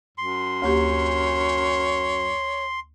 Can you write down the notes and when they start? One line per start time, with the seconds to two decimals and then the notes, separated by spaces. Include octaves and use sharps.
0.18 F#2 C6
0.62 D2 A#3 G4 C#5